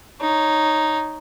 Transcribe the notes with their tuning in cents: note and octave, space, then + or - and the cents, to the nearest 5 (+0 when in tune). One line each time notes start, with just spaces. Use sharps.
D#4 +0 C#5 +0